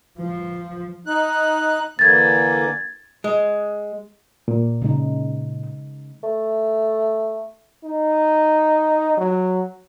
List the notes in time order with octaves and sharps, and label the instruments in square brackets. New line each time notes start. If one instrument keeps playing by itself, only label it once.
[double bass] F3
[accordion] D#4 F#6
[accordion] D3 E3 A#3 [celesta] G#6 A6
[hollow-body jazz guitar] G#3
[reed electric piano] A#2
[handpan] C#3 G#3 D#4
[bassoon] A3
[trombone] D#4
F#3